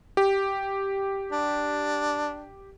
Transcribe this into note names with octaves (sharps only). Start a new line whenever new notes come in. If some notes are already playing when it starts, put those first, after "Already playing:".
G4
D4